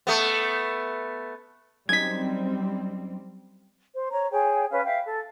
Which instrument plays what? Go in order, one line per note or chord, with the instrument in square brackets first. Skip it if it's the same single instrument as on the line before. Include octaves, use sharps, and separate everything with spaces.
[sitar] A3 B3
[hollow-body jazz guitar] F#2 D#4 [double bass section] G3 C4 [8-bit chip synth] G#6 B6
[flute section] C5
C#5 A#5
G#4 C#5 G5
C#4 B4 C#5 F5
E5 F5 G5
A4